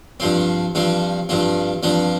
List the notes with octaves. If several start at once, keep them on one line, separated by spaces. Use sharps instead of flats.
G2 F3 C4
G2 F3 C4
G2 F3 C4
G2 F3 C4